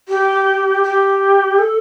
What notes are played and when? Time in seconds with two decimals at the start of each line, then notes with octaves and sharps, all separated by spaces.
0.09 G4
0.83 G4
1.59 A4